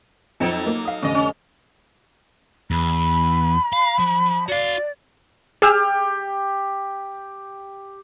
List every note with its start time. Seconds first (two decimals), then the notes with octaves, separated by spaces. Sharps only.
0.40 F2 F#3 C4 D#4 A4 G5
0.67 A#3
0.85 F5 D#6
1.03 F1 D3 C#4 D#5
1.15 C#4
2.71 E2 B5
3.73 F5
3.99 F3
4.48 F#4 D5 F5
5.62 G4 G#4 E6 F6